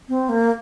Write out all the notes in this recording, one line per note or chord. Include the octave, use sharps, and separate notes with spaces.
C4
A#3